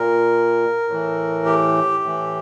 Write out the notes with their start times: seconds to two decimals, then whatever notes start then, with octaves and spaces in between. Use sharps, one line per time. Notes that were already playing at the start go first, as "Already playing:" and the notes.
Already playing: A#2 A#4
0.88 A2 E3
1.45 G4
2.03 A2 E3